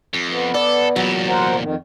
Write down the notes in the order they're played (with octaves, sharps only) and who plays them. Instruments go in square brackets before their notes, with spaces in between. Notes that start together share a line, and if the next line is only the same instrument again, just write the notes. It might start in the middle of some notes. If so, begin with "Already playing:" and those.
[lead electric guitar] F2
[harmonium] B3
[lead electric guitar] A4 [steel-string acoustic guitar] D5
[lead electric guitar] E2 A#2 [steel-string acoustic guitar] F#3
[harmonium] A#4 C5 F#5
F2 D#3